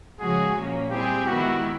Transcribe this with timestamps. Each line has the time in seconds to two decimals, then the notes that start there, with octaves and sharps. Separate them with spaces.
0.20 C#3 F3 G#3 C#4 F#4 G#4
0.55 A#2 F3 A#3 C#4
0.91 G3 C4 E4 G4 G#4
1.27 D#3 G#3 B3 E4 F#4 G4